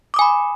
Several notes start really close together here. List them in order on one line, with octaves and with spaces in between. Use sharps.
D6 D#6 G#5 B5